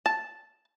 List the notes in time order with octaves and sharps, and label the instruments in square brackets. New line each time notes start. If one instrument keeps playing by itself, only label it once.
[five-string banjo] A5